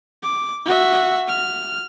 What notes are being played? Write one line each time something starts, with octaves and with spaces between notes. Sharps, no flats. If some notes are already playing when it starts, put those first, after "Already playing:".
D6
F#4 E5
F6